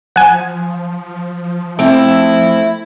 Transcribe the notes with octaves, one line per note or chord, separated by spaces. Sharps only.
F3 F#5 G#5
A3 C4 E4